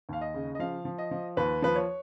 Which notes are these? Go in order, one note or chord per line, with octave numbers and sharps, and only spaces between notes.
D#2 F5
D#5
C#3
D#5
F3 F5
F3
D#5
F3
D#2 B4
F3 B4
C#5